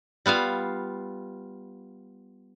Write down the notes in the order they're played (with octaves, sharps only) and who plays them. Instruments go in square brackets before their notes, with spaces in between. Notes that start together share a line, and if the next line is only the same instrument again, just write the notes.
[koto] G3 B3 F4 F5